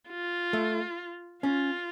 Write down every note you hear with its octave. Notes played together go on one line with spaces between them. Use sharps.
F4
A3
C#4 F4